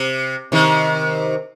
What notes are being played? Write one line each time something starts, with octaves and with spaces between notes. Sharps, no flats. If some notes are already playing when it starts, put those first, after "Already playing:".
Already playing: C3
C3 D#3